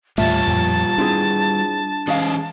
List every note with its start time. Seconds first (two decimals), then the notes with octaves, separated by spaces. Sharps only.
0.18 D#2 A2 G3 A3 F4 C#5 E5 A5
0.47 F2 A#2 F3
0.98 C4 D4 E4 G#4
2.08 E3 G#3 C#4 G#4 F5